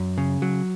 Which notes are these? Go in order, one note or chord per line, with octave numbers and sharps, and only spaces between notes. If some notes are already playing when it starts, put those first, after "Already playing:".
Already playing: F#2
C#3
F#3